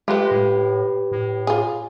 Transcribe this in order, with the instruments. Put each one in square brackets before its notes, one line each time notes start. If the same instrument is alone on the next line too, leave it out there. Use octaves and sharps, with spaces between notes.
[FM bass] G#3 [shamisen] A3 F4 [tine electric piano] G4 B4
[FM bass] A2
A2
[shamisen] F4 G#4